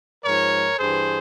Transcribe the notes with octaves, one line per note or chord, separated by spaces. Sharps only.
G#2 F3 A#4 C#5
G2 E3 G#4 C5